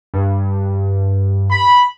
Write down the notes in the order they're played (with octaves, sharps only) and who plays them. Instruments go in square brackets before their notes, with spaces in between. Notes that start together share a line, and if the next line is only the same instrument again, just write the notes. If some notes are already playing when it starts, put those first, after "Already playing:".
[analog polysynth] G2
[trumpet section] B5